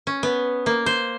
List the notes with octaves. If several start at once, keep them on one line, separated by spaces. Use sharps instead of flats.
C#4
B3
A#3
C5